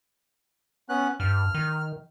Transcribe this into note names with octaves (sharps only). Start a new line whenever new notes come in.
B3 C#4 F#6
G2 F6
D#3